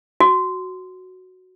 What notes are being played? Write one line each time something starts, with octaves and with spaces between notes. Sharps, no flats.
F#4